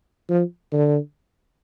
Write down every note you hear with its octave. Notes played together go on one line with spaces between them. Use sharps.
F3
D3